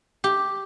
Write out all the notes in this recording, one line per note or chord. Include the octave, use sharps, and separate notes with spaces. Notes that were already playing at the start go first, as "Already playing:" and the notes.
G4